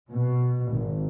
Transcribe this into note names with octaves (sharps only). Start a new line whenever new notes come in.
B2
G#1